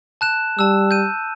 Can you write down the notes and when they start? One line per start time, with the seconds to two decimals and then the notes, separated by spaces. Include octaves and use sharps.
0.21 A5 F#6 E7
0.59 G3 A5 E6
0.91 G6 D#7